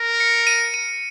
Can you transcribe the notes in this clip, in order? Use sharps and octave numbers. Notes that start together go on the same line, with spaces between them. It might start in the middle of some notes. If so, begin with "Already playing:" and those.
Already playing: A#4
C#7
D#7
D#7